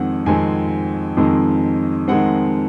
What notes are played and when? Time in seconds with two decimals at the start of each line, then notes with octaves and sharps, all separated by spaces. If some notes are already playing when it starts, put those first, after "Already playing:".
Already playing: F2 D#3 G#3 C4 F#5
0.26 F2 D#3 G#3 C4 G#5
1.17 F2 D#3 G#3 C4
2.08 D#3 G#3 C4 F#5